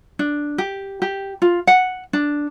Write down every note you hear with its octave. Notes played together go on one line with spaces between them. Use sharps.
D4
G4
G4
F4
F#5
D4